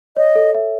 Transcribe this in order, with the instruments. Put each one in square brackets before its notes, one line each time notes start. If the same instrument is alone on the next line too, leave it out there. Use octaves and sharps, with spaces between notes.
[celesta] C#5 [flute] D#5
[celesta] A4
E5